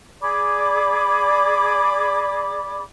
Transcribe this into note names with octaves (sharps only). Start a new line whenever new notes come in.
G#4 D5 B5 D6